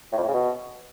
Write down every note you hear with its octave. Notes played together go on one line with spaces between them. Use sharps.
A2
F2
A2
C#3
B2